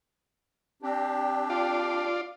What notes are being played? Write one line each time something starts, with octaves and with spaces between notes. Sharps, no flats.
C4 D4 G4
F4 D5